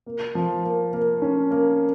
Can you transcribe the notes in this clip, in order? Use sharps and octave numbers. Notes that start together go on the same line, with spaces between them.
A#3
F3
A#3
A#3
C#4
A#3